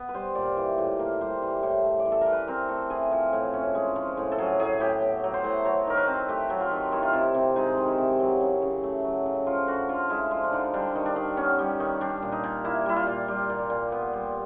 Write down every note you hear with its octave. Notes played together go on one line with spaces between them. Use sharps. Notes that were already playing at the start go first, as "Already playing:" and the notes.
Already playing: B3
B4
G3 C5
A#2 D5
E3
A2
A#3
G3 C5
E3
A2
A3
D5
E3
A4
A#4
E3
B4
C4 A#4
A3 A4
E3 G#4
F3
A2
C#4
G#3
F3
A2
A4
F#3 G#4
A2 G#4
A2 G4
B3
F#3
C5
A2
F#3 C#5
D#3 A#4
B4
C4
A3 G4
F#3
F4
D#3
D#3 E4
F4
C3 E4
C3
G#3 D#4
D#3
E4
C3
F#3
C#3
C#3
A3
F#3
C#3
F3 F4
D3 F#4
D3 F4
G#3 E4
F3 F4
D4
D3 D#4
G3 D4
D#3
D4
D#3
B3 C#4
G3
D#3
G3 D4
A#2
D#4
A#2
A#3 E4
G3 E4
F4
A#2
G3
A#2
A#2
B3
G3